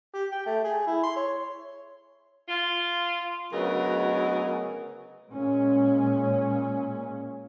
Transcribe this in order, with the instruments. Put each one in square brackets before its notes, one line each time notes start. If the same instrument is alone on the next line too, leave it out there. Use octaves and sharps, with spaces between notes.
[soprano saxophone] G4
G5
A3
G#4
E4
C6
C#5
[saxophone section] F4
D2 C#3 F#3 B3 A#4 D#5
[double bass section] A#2 G#3 C#4